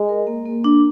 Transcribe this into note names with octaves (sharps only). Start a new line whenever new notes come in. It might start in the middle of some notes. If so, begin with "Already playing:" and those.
Already playing: G#3
A#4
A#3
A#3
D4